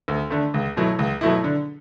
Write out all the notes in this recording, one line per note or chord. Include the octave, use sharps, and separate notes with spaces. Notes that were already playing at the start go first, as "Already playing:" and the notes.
D2
D3 A3
C#2
B2 F#3 A3 E4
C#2
B2 F#3 A3 E4
D3